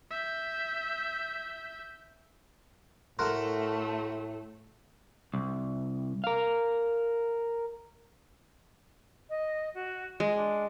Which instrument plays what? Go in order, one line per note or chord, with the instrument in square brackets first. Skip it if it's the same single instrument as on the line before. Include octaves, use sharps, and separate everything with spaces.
[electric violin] E5 G6
[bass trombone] A2 [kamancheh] A3 A4 [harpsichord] F#4 A#4 [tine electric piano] C6
[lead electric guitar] C2
A#4 F5
[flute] D#5
F#4
[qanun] G#3 [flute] D#5
[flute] D4